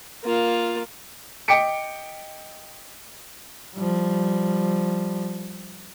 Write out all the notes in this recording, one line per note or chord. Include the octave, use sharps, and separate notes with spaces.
A#3 F4
D#5 G5 D6 B6 C#7 D7
F3 G3